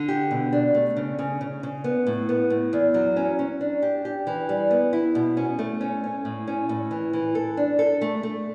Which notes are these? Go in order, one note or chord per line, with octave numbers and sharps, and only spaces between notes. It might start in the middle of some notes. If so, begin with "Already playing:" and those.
Already playing: D3
G4
B2
D4
A3
C#3
C#3
C#3
C#3
B3
A2
B3
A2
E2
F#3
C#4
C#4
D4
G4
G4
E3
G3
B3
E4
B2
C#4
A3
C#4
C#4
A2
C#4
A2
E3
E3
A4
D4
A4
A3
A3